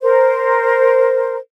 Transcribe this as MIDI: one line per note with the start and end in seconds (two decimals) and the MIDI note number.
0.02 1.37 70
0.02 1.37 72